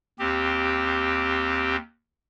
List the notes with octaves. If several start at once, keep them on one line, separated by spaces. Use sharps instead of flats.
D#2 C4 G4